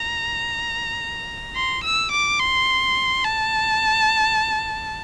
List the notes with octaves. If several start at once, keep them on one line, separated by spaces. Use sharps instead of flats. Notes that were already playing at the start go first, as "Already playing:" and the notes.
Already playing: A#5
C6
E6
D6
C6
A5